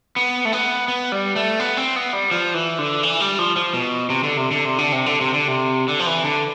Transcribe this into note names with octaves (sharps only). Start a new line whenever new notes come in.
B3
A3
B3
B3
G3
A3
B3
C4
B3
G3
F3
E3
D3
E3
G3
F3
F3
B2
C3
D3
C3
D3
C3
D3
C3
D3
C3
D3
C3
D3
F3
E3
D3